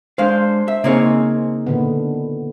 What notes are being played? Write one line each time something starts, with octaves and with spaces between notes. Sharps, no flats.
G#3 D4 C5 F5
E5
C#3 A#3 C4 D#4 G#4 C#5
A#2 D3 B3